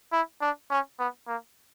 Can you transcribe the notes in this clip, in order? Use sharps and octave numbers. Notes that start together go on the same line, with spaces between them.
E4
D4
C#4
B3
A#3